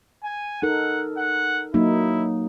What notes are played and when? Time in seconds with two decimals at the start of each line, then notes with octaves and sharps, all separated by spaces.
0.24 G#5
0.62 D#4 A4 A#4 F#5
1.18 F#5
1.74 F#3 A#3 D#4 E4